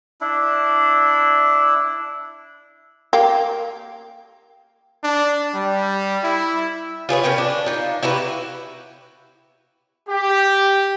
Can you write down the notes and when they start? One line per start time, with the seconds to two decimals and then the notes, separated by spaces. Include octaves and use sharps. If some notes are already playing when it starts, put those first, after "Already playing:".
0.21 D4 E4
3.13 A#3 G4
5.03 D4
5.54 G3
6.24 E4
7.09 F4 G#4 B4 C#5
7.24 C#4 A#4 B4 G5
7.38 D4
7.66 D#4 F4
8.03 E4 F#4 G4 B4
10.09 G4